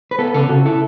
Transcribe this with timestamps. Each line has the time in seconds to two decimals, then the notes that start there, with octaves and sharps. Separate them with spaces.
0.11 B4
0.19 B3 A4
0.34 C#3 A4
0.49 C#3 F#4
0.65 E4 A4